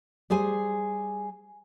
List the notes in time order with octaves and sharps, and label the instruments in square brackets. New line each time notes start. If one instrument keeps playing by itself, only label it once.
[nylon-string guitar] G3 G#4 C5 G#5